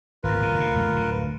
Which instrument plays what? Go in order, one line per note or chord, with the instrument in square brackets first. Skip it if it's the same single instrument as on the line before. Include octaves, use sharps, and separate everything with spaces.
[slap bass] G#1 E2 [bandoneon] F4 A#4 B4
[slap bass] D1 B2
D2 C3
D#1 F2 A3
D1 D3